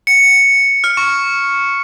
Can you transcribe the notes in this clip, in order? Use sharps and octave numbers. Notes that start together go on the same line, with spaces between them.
C#7
F6
C#6